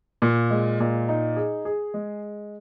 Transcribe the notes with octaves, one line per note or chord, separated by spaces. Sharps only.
A#2
G#3
A#2
D#4
G#4
G#4
G#3